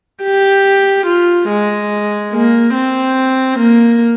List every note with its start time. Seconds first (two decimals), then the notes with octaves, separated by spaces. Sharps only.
0.23 G4
1.06 F4
1.49 G#3
2.32 A#3
2.74 C4
3.59 A#3